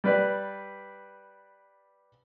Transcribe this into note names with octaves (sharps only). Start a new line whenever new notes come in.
G3 B4 D5